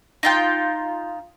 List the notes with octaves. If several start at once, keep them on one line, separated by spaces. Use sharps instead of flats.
D#4 F4 G5